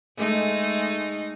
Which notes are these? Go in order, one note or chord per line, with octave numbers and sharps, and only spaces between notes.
G#3 A3 D#4